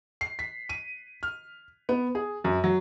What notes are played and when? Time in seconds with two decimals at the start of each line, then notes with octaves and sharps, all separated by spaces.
0.21 C7
0.39 B6
0.69 D#7
1.23 F6
1.89 B3
2.15 G#4
2.44 F#2
2.64 F#3